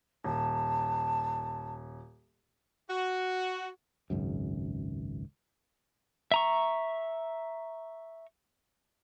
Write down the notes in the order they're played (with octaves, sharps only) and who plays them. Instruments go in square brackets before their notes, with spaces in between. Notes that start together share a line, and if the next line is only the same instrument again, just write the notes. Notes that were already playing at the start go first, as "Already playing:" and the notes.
[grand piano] D#1 [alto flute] A5
[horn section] F#4
[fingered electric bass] G#1 C#2 F#2
[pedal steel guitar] E5 A#5 C#6